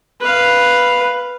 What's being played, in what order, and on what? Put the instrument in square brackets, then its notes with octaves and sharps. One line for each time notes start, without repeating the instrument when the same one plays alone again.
[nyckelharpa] B4 F5